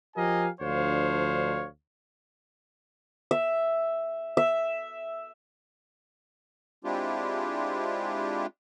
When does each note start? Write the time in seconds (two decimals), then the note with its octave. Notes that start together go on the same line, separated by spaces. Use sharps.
0.16 F3 G4 A#4 D#5 F5 G#5
0.61 D2 F3 D4 C5 C#5 F5
3.31 E5
4.37 E5
6.84 G#3 C4 D4 E4 F4 G4